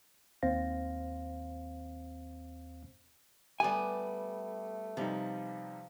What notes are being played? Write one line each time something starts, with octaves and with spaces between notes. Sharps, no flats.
D#2 C4 C5 F5 A#6
G3 A3 B3 G4 G#5
C3 F3 G3 D#4